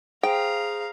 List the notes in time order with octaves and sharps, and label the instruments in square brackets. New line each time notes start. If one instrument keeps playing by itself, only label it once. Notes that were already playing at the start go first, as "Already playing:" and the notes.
[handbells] G#4 C5 [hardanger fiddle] F5 A#5 [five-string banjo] G5